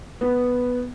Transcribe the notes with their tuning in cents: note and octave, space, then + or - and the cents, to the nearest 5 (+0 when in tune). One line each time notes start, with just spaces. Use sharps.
B3 +0